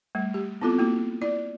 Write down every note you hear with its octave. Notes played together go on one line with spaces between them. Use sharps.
G3 A3
G4
B3 C4 E4 F4 A4
A#3 E4 F#4
E4 D5